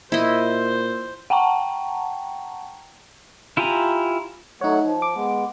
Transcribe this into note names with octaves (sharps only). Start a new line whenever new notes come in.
A#2 E4 C5 D#5
F#5 G5 A5 A#5 C#6
E4 F4 G4 G#5 A#5
F#3 A3 D#4 C#5 F#5
F3
D6
G#3 B3